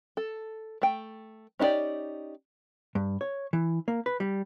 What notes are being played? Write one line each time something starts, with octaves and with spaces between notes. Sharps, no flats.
A4
A3 G5
C#4 D#4 F4 G4 D5
G2
C#5
E3
A#3
B4
G3